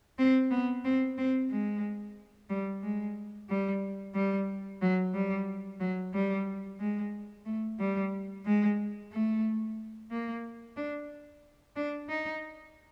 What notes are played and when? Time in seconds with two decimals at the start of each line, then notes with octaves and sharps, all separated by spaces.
0.19 C4
0.51 B3
0.85 C4
1.18 C4
1.51 G#3
2.50 G3
2.83 G#3
3.50 G3
4.15 G3
4.82 F#3
5.14 G3
5.80 F#3
6.14 G3
6.80 G#3
7.46 A3
7.80 G3
8.45 G#3
9.12 A3
10.11 A#3
10.77 D4
11.76 D4
12.09 D#4